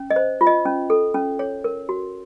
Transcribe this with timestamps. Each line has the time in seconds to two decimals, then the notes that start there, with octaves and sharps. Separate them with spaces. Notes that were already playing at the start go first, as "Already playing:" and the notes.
Already playing: C#4
0.10 D#5
0.16 C5
0.41 F4
0.47 D#5
0.66 C#4
0.90 A4
1.14 C#4
1.39 C#5
1.64 A#4
1.89 F#4